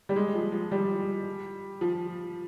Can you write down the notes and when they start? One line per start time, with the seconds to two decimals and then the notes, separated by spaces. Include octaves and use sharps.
0.09 G3
0.16 G#3
0.35 F3
0.52 F3
0.71 G3
1.81 F3